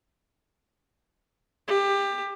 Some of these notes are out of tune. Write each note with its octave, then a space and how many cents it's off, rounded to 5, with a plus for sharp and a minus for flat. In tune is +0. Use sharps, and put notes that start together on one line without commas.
G4 +20